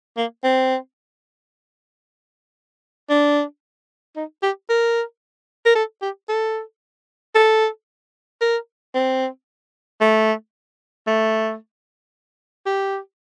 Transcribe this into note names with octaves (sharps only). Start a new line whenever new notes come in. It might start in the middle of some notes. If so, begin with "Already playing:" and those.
A#3
C4
D4
D#4
G4
A#4
A#4
A4
G4
A4
A4
A#4
C4
A3
A3
G4